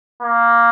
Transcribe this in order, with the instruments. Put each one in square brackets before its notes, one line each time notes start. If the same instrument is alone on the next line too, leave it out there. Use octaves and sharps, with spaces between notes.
[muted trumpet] A#3